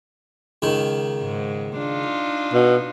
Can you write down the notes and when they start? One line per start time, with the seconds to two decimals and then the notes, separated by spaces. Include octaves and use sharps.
0.62 C#2 D#3
1.21 G#2
1.78 D4 D#4 F4
2.53 B2